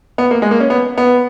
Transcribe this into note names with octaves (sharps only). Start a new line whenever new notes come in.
B3
A#3
G#3
A#3
C#4
B3
B3